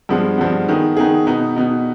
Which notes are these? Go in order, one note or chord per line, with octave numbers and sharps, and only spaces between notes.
G2 F3 G#3 B3
G2 F3 G#3 B3
D#3 B3 D#4 G#4
D#3 B3 D#4 G#4
B2 B3 D#4
B2 B3 D#4